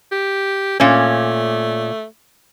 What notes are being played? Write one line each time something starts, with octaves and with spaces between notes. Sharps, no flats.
G4
A#2 A3 C#4